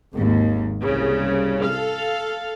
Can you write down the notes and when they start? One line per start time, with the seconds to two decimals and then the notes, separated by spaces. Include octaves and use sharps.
0.13 G#1 D#2
0.83 C2 C#3
1.65 A4 F5